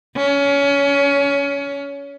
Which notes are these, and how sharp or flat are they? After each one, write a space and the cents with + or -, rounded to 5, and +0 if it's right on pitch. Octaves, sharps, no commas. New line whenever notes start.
C#4 +25